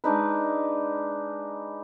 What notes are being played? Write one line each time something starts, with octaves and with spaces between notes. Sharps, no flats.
G#3 D4 D#4 B4